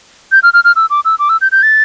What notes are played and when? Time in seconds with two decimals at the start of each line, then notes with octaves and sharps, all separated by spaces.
0.32 G6
0.43 F6
0.54 F6
0.64 F6
0.76 E6
0.90 D6
1.05 E6
1.19 D6
1.29 E6
1.41 G6
1.52 G6
1.63 A6